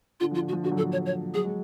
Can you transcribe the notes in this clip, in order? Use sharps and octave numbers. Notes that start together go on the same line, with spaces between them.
D3 F4
F3 F4
D3
F#4
F3
D3 F#4
F#3
F3 A4
C#5
C#5
F#3 G#4
G#3